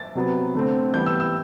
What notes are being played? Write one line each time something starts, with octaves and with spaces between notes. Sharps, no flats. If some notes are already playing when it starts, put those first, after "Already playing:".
Already playing: A6
C3 F#3 B3
D3 A3 C4
E3 G3 B3 G6
E6
E6